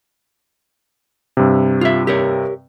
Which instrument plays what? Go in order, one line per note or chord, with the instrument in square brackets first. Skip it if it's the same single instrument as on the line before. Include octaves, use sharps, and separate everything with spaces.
[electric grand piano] G2 C3
[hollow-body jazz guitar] F4 E5
G4 A#4 C#5